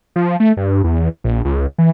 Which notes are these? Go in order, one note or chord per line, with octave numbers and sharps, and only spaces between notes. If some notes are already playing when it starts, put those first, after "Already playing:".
F3
A3
G2
E2
A#1
C#2
E3